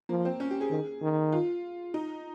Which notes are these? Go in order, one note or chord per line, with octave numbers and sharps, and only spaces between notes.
F3 A#3
C4
C#4
G4
G#4
D#3
D#3
F4
D#4